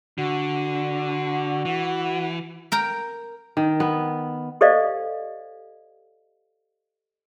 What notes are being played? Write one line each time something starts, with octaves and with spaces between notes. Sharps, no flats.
D3 F#4
E3
A#4 G5 A#5
D#3
B3
G4 A4 C5 D5 D#5 F5